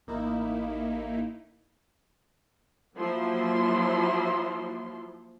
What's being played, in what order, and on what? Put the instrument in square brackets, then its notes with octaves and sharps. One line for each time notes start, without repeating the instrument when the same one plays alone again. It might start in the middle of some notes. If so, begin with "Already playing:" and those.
[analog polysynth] A1 A#3 D#4 E4
[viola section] F3 F#3 A#3 E4 F4 C6